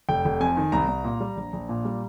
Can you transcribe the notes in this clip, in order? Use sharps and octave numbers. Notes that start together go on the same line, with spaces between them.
F1 G5
F1
F2 G#5
D#3
C2 A#5
C2
A#2
G3
A#1
A#1
A#2
G3